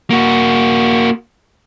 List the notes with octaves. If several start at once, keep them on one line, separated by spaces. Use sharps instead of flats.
A#3 F#4